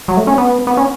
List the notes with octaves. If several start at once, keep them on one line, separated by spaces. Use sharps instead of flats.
F#3
A3
C#4
B3
B3
C#4